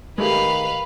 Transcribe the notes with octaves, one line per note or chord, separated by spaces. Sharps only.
D#3 G#3 A3 G4 B4 F5